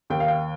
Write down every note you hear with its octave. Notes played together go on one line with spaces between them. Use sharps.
D#2 G5
F5
G5